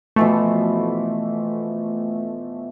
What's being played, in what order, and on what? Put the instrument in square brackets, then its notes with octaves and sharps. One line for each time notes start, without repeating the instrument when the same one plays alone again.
[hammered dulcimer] B2 E3 F3 [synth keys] A3